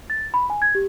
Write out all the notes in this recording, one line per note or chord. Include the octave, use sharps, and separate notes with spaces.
A6
B5
G#5
G#6
G4